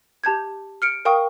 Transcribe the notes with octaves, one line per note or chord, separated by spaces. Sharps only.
G4 A5 G6 G#6
F6 C#7 D7
A#4 F5 G5 C#6 D#6